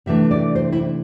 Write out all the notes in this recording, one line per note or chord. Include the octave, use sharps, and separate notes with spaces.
C3 E3 A3 D4 E5
D5
C5
E4